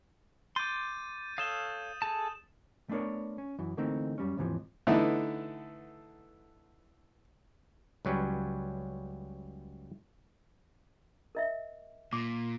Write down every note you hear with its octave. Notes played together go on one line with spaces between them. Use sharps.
C6 D6 G6 A6 D#7
A4 C#5 F5 D#6 E7 G7
G#4 A4 A5
A3 B3 D4 A#4 C#5
C#4
F#2 E3
D3 E3 A3 A#3 C4 D#4
F#2 G3 C#4
D#2 G#2 C3 E3 F3
D3 E3 A3 B3 D#4 E4
C#2 F#3 G3 C#4 B4
A#4 D#5 E5
A#2 D6